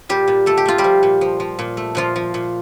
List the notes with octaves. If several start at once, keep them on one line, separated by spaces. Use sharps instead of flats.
A#2 G3 G4
A#2
A3 A4
G4
A3 F4
G3 G4
F3
A#2
F3
F3
A#2
A3
A#2 F3 F4
F3
A#2